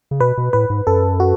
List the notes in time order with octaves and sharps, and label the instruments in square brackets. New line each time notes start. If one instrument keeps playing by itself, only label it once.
[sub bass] C#3
[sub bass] B2 [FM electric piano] B4
[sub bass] B2
[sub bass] A2 [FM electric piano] B4
[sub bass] G#2
[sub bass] F#2 [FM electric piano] A4
[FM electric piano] F#4